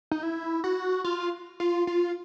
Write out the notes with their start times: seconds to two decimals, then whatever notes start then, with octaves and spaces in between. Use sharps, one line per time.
0.11 D#4
0.23 E4
0.64 F#4
1.04 F4
1.60 F4
1.87 F4